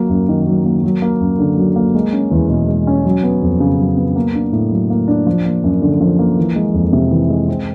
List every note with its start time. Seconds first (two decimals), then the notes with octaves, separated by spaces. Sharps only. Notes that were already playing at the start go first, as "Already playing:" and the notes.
Already playing: F#3 A#3
0.09 F#2
0.29 D#3
0.47 F#3
0.65 A#3
0.84 F#3
1.02 A#3
1.20 F#2
1.39 D3
1.58 F#3
1.76 A#3
1.95 G#3
2.13 C#4
2.31 E2
2.50 B2
2.68 G#3
2.87 C#4
3.05 F#3
3.23 B3
3.42 F2
3.60 C#3
3.79 F#3
3.97 B3
4.16 A#3
4.34 D4
4.53 A2
4.71 F#3
4.90 A#3
5.08 D4
5.27 F3
5.45 A#3
5.64 F#2
5.82 D3
6.00 F3
6.19 A#3
6.37 E3
6.56 G#3
6.74 F2
6.93 C3
7.11 E3
7.30 G#3
7.48 C4